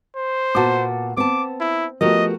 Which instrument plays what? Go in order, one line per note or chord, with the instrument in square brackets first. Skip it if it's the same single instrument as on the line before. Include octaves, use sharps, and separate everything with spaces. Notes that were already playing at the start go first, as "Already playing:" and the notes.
[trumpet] C5
[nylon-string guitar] A#2 B3 F#4 [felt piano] A5 D6
[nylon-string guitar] B3 A5 [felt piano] C4 [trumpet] D6
[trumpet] E4
[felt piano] F3 A3 B3 [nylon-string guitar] F#4 G4 A#4 [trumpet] D#5